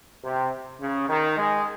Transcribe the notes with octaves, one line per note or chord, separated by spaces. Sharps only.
C3
C#3
D#3
G#3